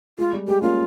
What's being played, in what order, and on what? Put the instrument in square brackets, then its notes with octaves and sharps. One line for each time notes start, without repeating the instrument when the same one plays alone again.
[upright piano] G#3 [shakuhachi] F4
[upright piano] G3
[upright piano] G#3 [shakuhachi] G4
[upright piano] A#3 C#4 [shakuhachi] F4